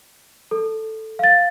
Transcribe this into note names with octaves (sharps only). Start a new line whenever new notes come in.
A4
F5 A6